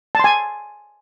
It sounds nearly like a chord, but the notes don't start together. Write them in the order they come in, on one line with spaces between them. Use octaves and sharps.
A5 C6 G#5